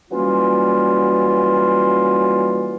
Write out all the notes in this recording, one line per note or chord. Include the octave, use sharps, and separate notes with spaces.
E3 F#3 G3 A#3 C#4 F4